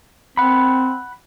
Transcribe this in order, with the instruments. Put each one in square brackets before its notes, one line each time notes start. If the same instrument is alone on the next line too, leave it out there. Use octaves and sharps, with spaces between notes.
[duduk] C4 [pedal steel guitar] F#5 B5